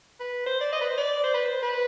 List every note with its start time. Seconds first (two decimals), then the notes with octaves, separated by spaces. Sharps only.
0.20 B4
0.46 C5
0.61 D5
0.72 D#5
0.81 B4
0.90 C5
0.97 D5
1.24 C5
1.34 B4
1.45 C5
1.62 B4